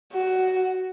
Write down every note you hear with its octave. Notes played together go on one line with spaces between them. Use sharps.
F#4